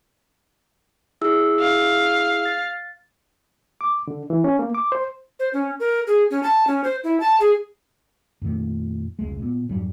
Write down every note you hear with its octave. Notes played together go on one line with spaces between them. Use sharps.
E4 G#4 E6
F5
A6
D6
D3
E3
C#4
A#3
D6
C5
C5
C#4
A#4
G#4
C#4
A5
C#4
C5
E4
A5
G#4
F2 A#2 D#3 A3
F1 C#2 G#3
A#2 B3
F2 G#2 F#3 G3